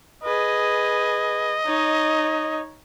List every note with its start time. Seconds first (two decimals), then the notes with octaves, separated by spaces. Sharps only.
0.24 G#4 B4 D#5
1.65 D#4 C#5